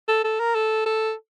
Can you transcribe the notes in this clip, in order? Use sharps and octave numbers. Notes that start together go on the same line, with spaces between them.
A4
A4
A#4
A4
A4